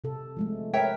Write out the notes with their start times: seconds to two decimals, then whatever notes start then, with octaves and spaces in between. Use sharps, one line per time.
0.04 C3 A4
0.37 F3 G#3 A3
0.74 A#4 B4 C#5 E5 G5